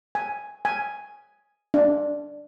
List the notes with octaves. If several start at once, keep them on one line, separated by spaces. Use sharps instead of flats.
G#5
G#5
D4